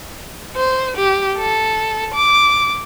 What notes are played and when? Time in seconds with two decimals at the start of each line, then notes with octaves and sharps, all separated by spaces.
0.56 C5
0.97 G4
1.37 A4
2.14 D6